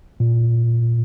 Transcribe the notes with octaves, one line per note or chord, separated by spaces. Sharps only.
A#2